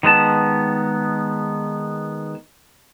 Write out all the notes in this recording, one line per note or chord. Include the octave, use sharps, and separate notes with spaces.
D#3 G#3 B3 A5